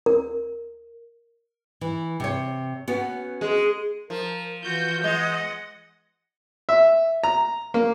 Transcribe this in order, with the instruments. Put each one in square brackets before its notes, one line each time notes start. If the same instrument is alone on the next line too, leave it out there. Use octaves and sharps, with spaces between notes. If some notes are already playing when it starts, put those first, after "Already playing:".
[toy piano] A#4
[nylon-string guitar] E3
C3 C#5
B3 C#4 F#4
[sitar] G#3
[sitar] F3 [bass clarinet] A#4
[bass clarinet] E3 [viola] F4 F#4 [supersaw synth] G6
[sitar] G#3 [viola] D#5 F#5
[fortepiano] E5
A#5
A#3